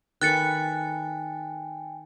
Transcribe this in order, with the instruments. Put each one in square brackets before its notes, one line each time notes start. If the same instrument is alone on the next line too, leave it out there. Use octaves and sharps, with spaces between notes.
[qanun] D#3 A4 B4 [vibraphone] G5 G#5 [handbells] F#6 A6 C#7